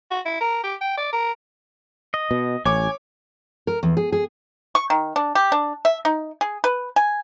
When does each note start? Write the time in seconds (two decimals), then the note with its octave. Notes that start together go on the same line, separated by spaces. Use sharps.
0.11 F#4
0.25 E4
0.41 A#4
0.63 G4
0.81 G5
0.97 D5
1.13 A#4
2.14 D#5
2.31 B2
2.65 A1 C#5 G#5 D6
3.67 A#4
3.83 E2
3.97 G#4
4.12 G#4
4.75 C#6
4.90 D#3
5.16 D4
5.35 G4
5.52 D4
5.85 E5
6.05 D#4
6.41 G#4
6.64 B4
6.96 G#5